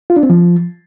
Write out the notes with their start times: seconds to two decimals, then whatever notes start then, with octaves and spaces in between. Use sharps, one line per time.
0.10 F4
0.16 D4
0.23 C4
0.30 F3